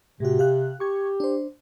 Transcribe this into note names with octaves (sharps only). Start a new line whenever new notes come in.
A2 C3 F#4
G4 F5 F#6
G4 C#6 G#6
D4 C5